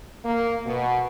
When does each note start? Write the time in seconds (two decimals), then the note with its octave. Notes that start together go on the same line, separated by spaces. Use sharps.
0.24 A#3
0.66 B2